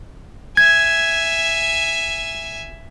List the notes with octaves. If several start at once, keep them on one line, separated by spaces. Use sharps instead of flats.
E5 G#5 G#6